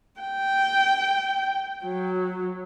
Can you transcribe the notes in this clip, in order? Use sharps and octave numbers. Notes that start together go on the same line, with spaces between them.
G5
F#3